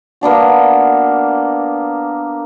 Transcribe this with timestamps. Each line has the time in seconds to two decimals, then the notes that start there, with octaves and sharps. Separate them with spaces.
0.21 A#3 B3 D4 F#4